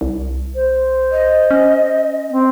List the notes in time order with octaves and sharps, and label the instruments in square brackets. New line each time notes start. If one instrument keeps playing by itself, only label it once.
[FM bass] C2
[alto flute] C5
[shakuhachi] D#5
[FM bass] C#4
[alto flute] C4